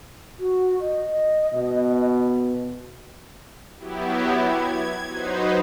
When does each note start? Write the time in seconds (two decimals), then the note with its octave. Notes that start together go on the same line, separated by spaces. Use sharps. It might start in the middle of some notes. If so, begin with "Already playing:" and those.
0.39 F#4
0.80 D#5
1.54 B2
3.78 F#3 B3 E4 G4
4.36 G#6
5.07 F#3 D#4 B4 C5